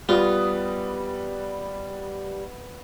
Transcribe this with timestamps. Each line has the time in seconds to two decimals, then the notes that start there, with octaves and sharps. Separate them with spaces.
0.09 G3 B3 F4 D#5